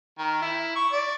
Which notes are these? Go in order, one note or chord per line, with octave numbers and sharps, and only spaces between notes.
D#3
E4
C#6
D5